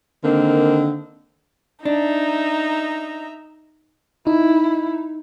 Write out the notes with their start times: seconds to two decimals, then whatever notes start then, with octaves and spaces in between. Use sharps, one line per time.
0.24 D3 D#3 A#3 C4
1.85 D4 D#4 E5 A#5
4.27 D#4 E4